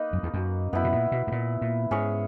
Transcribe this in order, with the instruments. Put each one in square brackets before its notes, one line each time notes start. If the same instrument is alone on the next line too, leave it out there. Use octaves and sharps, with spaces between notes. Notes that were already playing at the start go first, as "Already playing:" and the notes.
Already playing: [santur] A#3 D#4 B4
[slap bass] F#2
E2
F#2
[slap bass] F#2 [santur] B3 E4 B4
[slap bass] B2
A#2
B2
G#2
A#2
A#2
[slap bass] G#2 [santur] C#4 G#4 C#5